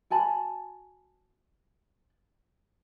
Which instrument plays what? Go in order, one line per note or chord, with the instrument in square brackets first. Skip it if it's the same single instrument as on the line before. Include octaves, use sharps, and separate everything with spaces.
[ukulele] F#4 G#5 A5 B5